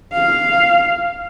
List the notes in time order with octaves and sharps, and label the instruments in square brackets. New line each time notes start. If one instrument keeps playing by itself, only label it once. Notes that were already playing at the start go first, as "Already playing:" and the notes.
[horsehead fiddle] F5